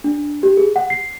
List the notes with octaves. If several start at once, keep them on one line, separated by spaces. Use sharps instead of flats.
D4
G4
G#4
F#5
C7